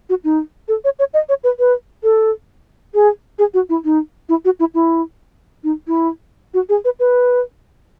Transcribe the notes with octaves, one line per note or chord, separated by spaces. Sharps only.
F#4
D#4
A4
C#5
C#5
D#5
C#5
B4
B4
A4
G#4
G#4
F#4
E4
D#4
E4
F#4
E4
E4
D#4
E4
F#4
G#4
B4
B4